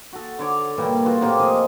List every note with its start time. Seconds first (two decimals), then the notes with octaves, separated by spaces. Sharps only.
0.12 F#4 A4
0.39 D3 C#5 D6
0.78 G2 A#2 E3 G3
1.05 F4 F#4 A4
1.21 A2 C3 A#3 G4
1.39 F3 D#5 F5 G#5